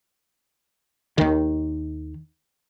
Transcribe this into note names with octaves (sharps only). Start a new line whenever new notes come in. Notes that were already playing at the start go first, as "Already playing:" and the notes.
D#2 D#3